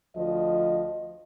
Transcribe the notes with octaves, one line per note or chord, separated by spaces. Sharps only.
D2 F3 D#5